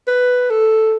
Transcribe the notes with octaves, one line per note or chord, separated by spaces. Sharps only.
B4
A4